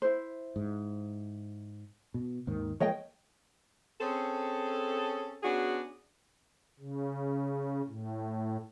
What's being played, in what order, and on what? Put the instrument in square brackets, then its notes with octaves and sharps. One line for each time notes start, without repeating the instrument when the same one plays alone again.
[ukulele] E4 C5
[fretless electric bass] G#2
B2
D#2 G#2 D#3
[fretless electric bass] F3 G#3 A#3 [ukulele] C#5 D#5 G5
[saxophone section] C4 C#4 G#4 A4
B3 C#4 D4 F#4 G#4
[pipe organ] C#3
A2